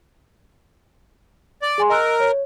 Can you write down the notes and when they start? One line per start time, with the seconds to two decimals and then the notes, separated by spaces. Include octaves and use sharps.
1.62 D5
1.78 G#4 G#5 C6
1.90 A#4 D#5 E6 F#6
2.20 C#5